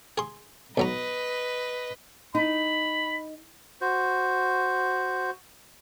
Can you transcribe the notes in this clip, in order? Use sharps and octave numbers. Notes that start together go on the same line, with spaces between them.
G#4 C6
B1 F#3 B4 D#5 A#5
D#4 B5
F#4 C5